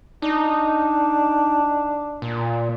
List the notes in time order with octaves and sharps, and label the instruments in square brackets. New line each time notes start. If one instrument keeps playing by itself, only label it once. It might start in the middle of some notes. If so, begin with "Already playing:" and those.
[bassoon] D4 [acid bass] D#4
[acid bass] A#2